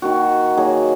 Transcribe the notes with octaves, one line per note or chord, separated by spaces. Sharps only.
D#3 A#3 F#4
D#3 F#3 A#3 G#4